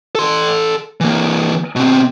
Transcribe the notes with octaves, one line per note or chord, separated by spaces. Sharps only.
A4 C6
E3 A#3
B2 C4